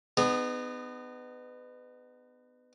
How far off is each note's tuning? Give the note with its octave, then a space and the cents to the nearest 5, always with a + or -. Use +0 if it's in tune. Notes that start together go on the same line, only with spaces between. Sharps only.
B3 +25 D#4 -30 G#4 +0